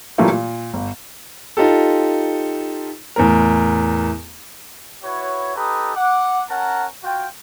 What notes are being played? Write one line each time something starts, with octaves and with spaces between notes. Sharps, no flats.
A#2 E3 F#3 G3 A3 A#3
A#2
G1
D#4 F4 G4 A4
E2 A2 A#4
E4 F#4 B4 C#5
D#4 G4 A4 B4 A#5 D#6
F#5 D6
C#4 A#4 F#5 A5 A#5
F4 F#4 G5